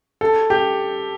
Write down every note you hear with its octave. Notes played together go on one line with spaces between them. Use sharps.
A4
G4